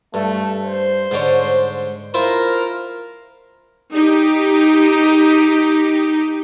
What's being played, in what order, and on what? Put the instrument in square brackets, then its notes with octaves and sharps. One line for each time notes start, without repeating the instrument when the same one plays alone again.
[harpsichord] G2 [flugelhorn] A3
[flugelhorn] C5
[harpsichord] G#2 D3 C#5
[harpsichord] E4 F4 C5 [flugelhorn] A#4
[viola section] D#4 G4